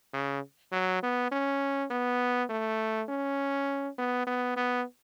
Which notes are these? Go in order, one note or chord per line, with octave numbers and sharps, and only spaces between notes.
C#3
F#3
B3
C#4
B3
A3
C#4
B3
B3
B3